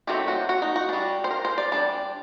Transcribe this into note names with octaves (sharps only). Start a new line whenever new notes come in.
D#3 F#3 A3 C4 G4
F#4
F#4
D#4
F#4
G3 D4
C5
A#4
C5
D5
G3 D4 D5